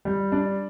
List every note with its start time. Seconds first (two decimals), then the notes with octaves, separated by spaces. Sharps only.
0.05 G3
0.32 D4